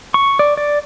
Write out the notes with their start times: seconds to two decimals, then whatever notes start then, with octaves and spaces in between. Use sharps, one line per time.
0.14 C#6
0.39 D5
0.57 D5